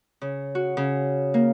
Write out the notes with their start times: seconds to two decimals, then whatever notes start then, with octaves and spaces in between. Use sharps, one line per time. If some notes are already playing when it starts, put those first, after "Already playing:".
0.21 C#3
0.55 F#4
0.77 C#3
1.34 A#3